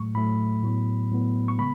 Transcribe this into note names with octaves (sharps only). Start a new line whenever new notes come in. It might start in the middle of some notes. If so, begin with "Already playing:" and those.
Already playing: A2 F#3 A3 C#6
A2 F#3 A3 B5
A2 F#3 B3
A2 F#3 B3
C#6
C#3 G#3 B3 B5